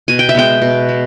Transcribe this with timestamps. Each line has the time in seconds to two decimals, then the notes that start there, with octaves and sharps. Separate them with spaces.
0.08 B2 G#5
0.19 G5
0.29 E5
0.35 G#3 B3 G5
0.62 B2
0.89 G#3